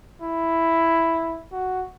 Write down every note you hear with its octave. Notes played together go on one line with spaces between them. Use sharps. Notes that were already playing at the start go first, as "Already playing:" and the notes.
E4
F#4